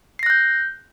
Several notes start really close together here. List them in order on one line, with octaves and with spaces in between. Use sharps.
C7 A#6 F#6 G6